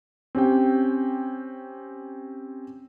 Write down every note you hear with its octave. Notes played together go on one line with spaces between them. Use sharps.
C4 C#4 G4 G5